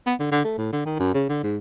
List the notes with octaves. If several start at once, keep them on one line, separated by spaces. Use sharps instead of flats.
B3
D3
D3
A3
A2
D3
D#3
F#2
C#3
D3
G#2